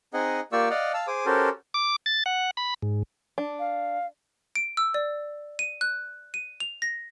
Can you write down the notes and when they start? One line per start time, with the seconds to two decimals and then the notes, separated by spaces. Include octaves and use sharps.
0.14 C4 D#4 G#4 D#5 F#5
0.52 A#3 F4 G4 D5 C#6 E6
0.70 D5 D#5 F5 F#5
0.94 F5 A5 E6
1.07 G#4 C5 D6 D#6
1.26 C#4 F#4 G4 A4 A#4 C5
1.74 D6
2.06 A6
2.26 F#5
2.57 B5
2.82 G#2
3.38 D4
3.59 F5
4.56 D7
4.77 E6
4.94 D5
5.59 D#7
5.81 F#6
6.34 D#7
6.60 F7
6.82 A#6